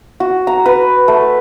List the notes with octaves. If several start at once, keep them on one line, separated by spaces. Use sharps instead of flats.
F#4
A#5
B4
A3